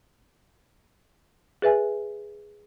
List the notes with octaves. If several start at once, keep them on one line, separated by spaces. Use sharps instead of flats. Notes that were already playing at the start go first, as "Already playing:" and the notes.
G#4 B4 E5 G#5